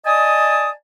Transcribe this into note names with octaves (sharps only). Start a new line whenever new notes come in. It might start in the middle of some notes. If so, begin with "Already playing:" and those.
D5 D#5 G#5 A5 D#6